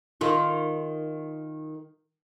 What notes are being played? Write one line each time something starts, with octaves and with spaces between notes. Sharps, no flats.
D#3 F4